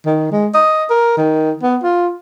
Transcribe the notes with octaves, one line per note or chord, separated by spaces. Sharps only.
D#3
G#3
D#5
A#4
D#3
B3
F4